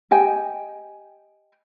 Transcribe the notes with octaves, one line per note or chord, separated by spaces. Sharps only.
G4 D#5 G5 G#5